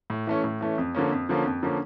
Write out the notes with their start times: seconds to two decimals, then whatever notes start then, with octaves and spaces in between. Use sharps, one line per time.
0.10 A2
0.27 E3 A3 C#4
0.44 A2
0.61 E3 A3 C#4
0.78 F2
0.95 D3 F3 A#3 C#4
1.12 F2
1.29 D3 F3 A#3 C#4
1.46 F2
1.63 D3 F3 A#3 C#4